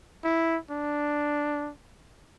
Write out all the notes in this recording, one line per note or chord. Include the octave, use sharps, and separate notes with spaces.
E4
D4